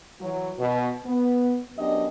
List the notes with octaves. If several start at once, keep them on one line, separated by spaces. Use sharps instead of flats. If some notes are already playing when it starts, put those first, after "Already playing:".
E3 F#3
B2
B3
F#2 B3 D4 G4 D#5